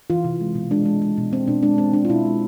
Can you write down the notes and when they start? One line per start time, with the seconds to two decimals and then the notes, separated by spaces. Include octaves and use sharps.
0.10 E3 F4
0.24 C3
0.41 G#3
0.55 B2
0.71 G#3 D4
0.86 G#3
1.02 G#3
1.18 B2
1.32 B2 C4
1.47 B2 D4
1.63 G#3 D4
1.78 G#3 C4
1.93 G#3 D4
2.05 F4
2.09 B2 E4
2.25 G#3